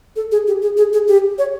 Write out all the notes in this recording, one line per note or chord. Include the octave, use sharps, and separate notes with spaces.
A4
G#4
G4
G#4
G#4
G#4
G4
C#5